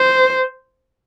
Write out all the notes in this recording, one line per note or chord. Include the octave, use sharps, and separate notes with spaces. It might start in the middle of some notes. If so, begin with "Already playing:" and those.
Already playing: C5